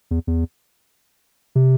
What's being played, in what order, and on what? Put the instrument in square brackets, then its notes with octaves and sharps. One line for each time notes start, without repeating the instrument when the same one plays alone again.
[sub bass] E2
E2
C3